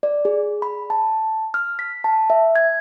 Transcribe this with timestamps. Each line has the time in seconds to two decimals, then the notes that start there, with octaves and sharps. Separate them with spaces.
0.03 D5
0.25 G#4
0.62 B5
0.90 A5
1.54 F6
1.79 B6
2.04 A5
2.30 E5
2.56 G#6